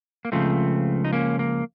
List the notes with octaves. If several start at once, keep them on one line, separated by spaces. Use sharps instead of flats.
A#3
C#2 C#3 F3 A3 C4
D#4
A#3 C#4
A#3